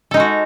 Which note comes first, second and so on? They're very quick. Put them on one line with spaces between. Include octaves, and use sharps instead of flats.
A4 D#4 G#3 F#4